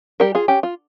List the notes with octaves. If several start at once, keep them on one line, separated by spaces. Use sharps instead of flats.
G3 G4 A#4
F4 G#4
C#4 G4
F4